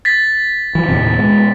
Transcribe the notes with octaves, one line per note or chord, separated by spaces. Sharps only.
A6 B6
E3 F3
D#2 A2 C3
B2 G#3